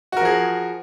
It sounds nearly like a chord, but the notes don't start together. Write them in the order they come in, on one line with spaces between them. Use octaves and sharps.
F#4 A#4 F3 G#4